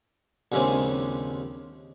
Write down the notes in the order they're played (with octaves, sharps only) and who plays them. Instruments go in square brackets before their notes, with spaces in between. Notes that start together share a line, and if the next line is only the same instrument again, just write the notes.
[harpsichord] A#1 D#2 C#3 G#3 C4 G#5